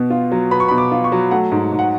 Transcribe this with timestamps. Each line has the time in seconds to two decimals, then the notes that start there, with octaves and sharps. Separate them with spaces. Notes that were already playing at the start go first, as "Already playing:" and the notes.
Already playing: B2 B3
0.10 F4
0.32 F#3
0.51 B3 B5
0.60 C#6
0.68 B5
0.71 B2
0.78 D6
0.92 F4
1.04 C#6
1.12 F#3
1.31 A3 F#5
1.52 G#2
1.72 G#2
1.79 F#5